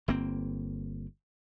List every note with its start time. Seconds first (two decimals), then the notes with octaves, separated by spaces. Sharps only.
0.08 G1 A#3 C4